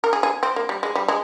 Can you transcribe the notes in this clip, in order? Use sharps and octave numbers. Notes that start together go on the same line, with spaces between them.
A#4
G#4
G#4
C4
A#3
G3
G#3
G3
G#3